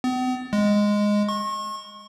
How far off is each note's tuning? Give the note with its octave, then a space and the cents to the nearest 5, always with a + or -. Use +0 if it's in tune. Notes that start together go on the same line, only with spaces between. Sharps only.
B3 +45
G#3 -5
C#6 -40